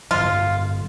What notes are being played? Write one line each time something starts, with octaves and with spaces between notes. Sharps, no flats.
G2 D3 F#3 F4